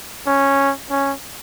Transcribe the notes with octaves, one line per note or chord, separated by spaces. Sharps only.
C#4
C#4